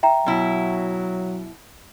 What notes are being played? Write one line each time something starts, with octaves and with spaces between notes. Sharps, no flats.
E5 G5 A#5
B2 F#3 E4